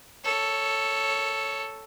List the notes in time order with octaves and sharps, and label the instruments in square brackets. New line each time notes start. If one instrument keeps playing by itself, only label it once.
[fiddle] A4 C#5